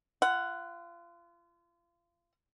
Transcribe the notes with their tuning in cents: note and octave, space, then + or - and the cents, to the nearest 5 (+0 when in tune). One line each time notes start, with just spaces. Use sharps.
F4 -30 F#5 +5